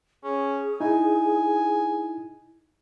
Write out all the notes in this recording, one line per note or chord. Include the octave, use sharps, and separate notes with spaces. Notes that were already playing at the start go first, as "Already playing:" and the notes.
C#4 G#4
D#4 E4 G#5